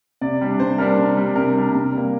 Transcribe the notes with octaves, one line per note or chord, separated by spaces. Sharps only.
C3 D5
G3 D4
C3 C5
G3 D4 A#4
C3
G3 D4
C3 A#4
G3 D4
C3
G3 A#3